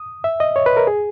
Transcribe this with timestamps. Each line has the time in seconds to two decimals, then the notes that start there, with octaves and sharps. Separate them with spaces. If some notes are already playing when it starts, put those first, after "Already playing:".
Already playing: D#6
0.24 E5
0.40 D#5
0.56 C#5
0.66 B4
0.77 A#4
0.87 G#4